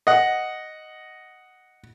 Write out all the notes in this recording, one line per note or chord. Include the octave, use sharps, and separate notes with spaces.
D#5 F#5